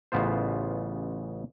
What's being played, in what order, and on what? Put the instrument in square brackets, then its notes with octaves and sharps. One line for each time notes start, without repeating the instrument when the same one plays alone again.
[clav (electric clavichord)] A1 C#3 B3 F4 C5